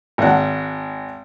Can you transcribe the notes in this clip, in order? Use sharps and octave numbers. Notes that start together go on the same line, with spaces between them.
G#1 F#5